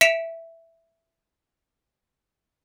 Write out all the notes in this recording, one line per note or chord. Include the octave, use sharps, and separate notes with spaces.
E5 B6 C#7 D7 E7 F7